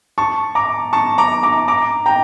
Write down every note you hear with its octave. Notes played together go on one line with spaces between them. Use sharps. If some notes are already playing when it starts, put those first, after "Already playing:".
A5 C#6
A#5 D6
A5 C#6
A#5 D6
A#5 D6
A#5 D6
G5 A#5